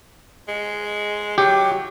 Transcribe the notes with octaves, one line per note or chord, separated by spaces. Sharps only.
G#3
F#3 G4